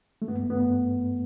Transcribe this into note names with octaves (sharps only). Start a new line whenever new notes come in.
A3
G2 B3
A3
B3
G2